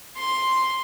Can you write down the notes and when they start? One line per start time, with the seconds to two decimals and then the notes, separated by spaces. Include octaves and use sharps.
0.17 C6